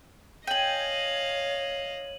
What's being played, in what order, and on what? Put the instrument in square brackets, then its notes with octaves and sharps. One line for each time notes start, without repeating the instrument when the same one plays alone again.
[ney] C#5 [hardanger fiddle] D#5 F5 [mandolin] G5 G#5 [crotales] D#7 F#7